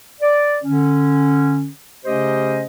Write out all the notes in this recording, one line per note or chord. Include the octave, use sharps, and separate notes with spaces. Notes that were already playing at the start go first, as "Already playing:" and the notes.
D5
D3 C#4
C#3 A3 C#4 G4 C5 D#5